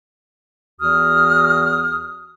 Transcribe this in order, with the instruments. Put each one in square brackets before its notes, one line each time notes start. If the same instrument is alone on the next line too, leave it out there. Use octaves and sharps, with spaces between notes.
[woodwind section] E2 E3 F#4 D#6 F6